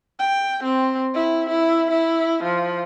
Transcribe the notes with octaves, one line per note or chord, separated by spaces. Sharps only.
G5
C4
E4
E4
E4
F3